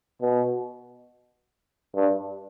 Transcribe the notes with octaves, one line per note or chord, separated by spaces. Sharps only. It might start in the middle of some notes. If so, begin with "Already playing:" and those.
B2
G2